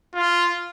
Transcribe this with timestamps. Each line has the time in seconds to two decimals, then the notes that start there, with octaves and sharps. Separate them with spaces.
0.15 F4